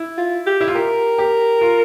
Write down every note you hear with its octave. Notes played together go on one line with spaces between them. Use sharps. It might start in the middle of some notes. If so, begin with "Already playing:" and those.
Already playing: E4
F4
G4
E4
F4
G4 A#4
G4
F4